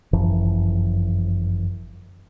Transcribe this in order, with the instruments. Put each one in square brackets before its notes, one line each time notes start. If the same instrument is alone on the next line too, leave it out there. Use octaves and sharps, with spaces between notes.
[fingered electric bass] G1 F#2 E3 F3